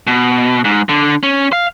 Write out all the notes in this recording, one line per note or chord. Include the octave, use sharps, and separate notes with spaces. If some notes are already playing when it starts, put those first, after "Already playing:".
B2
G#2
D3
C#4
F5